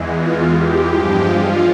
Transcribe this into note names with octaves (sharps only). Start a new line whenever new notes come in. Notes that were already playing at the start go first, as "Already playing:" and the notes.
Already playing: E2 E3 G#3
F4
G4
G2 F3 G#3
F4